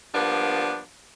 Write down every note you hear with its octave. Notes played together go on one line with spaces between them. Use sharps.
F3 G3 A#3 B3 D4